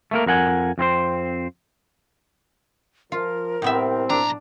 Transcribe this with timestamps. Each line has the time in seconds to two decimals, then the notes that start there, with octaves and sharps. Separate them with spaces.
0.11 A3 A#3 A#4
0.26 F2 A#4 F#5 G#5
0.78 F2 C4 E4 C5
3.12 F3 F4 A#4
3.62 C2 A2 B3 C4 E5
4.10 B1 D4 A#5